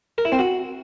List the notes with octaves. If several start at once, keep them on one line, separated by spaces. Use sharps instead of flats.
A#4
E4
C4
F#4